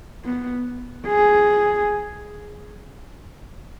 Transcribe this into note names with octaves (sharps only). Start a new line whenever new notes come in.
B3
G#4